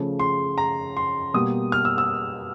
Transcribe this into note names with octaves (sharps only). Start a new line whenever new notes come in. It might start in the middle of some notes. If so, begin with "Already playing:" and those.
Already playing: C#3 F3 A3
C6
A#5
C6
B2 G3 A#3 D#6
F6
E6
E6